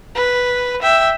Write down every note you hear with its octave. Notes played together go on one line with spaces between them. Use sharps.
B4
E5 G5